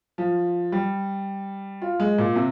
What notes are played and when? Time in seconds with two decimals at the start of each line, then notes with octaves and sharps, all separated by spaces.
0.18 F3
0.72 G3
1.82 F4
2.00 G#3
2.18 A#2
2.36 C3